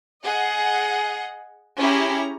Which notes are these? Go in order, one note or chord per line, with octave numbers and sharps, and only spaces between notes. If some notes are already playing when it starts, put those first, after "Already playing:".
G#4 D#5 F#5
C#4 E4 G4 G#4 A#5